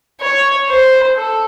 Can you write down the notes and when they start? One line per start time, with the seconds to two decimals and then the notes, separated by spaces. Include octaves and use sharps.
0.21 C#5
0.68 C5
1.16 A4